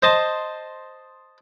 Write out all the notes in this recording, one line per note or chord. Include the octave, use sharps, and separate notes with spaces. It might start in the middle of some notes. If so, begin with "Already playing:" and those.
C5 D#5 A5 C6